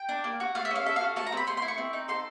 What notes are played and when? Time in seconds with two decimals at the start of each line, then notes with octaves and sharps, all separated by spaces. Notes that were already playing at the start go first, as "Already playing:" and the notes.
Already playing: G5
0.09 D4
0.24 A#3
0.40 F#4
0.55 A3 F5
0.65 E5
0.71 C#4 F5
0.86 A4 E5
0.96 F5
1.01 F#4
1.16 A3 A5
1.26 A#5
1.32 C4 B5
1.47 A3 C6
1.57 C6
1.62 E4
1.68 C#6
1.78 C4
1.93 D#4
2.08 A4 C6